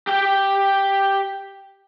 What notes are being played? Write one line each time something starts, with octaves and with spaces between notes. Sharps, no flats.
G4 G5